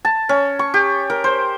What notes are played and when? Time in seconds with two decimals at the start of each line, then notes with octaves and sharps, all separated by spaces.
0.05 A5
0.29 C#4
0.59 C#6
0.74 G4
1.10 A#4
1.24 C5